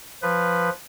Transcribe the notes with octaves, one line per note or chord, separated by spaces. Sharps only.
F3 B4